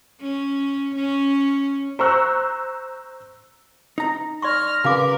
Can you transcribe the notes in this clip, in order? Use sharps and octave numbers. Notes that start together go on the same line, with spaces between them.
C#4
C#4
C5 A#5 C#6 E6 F#6
D#4 A#5
D5 C6 C#6 F6 A#6
C#3 F#4 A#4 B4 F5 D6